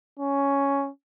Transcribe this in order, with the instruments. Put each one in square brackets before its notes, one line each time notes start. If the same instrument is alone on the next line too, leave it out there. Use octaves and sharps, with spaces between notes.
[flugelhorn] C#4